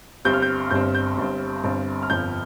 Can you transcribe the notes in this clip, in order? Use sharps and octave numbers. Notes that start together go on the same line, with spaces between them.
G1 G2 G3 C4 G6
F6
G6
G1 G2 G3 C4 G6
G6
G1 G2 G3 C4
G1 G2 G3 C4
F6
G1 F2 F3 G6